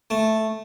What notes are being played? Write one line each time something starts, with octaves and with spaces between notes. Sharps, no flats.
A3